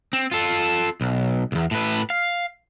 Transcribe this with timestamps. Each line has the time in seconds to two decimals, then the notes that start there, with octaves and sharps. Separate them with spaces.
0.13 C4
0.31 F4 A4
1.01 B1
1.52 B1 E2
1.71 A2 B4
2.10 F5